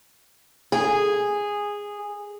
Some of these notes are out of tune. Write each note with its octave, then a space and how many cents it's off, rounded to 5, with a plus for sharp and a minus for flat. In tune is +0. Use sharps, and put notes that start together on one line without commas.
G#4 -10